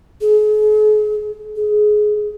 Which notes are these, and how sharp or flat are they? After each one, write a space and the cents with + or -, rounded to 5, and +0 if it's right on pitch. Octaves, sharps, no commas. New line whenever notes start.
G#4 +40
G#4 +20